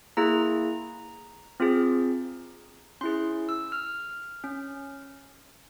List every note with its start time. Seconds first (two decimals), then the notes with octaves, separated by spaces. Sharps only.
0.17 A#3 E4 G#4 A#5
1.60 C4 F4 G#4
3.01 C#4 E4 G#4 C6
3.49 E6
3.72 F6
4.44 C#4